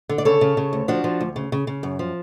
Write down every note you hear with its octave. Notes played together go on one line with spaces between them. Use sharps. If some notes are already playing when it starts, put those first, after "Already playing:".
D3
D5
C#3 A4 C#5
C#3
C#3
D2
F3 D4 F#4
F3
D2
C#3
C#3
C#3
F#2
F3